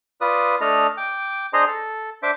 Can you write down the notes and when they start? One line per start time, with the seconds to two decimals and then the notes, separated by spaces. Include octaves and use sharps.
0.21 F4 B4 D5 D#6
0.61 A3 D4 A4 D#5 F6
0.97 G5 D6
1.53 D4 G#4 C5 D#5 A#5 C6
1.68 A4
2.23 D4 C5 E5 D6